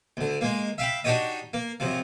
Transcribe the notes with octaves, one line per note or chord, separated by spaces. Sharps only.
D2 D3
G#3 A#3
E5 F5 G5 B5
D4 D#4 F#4 G4 C#5 D#5
A#3
F#2 C3 F3